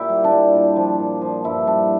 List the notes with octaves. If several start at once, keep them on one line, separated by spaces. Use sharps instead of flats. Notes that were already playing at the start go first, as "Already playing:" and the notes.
Already playing: A#2 E4 G4
G3
D4
G3
A#2
F3
A#2
F3
G2 E4
G2 D4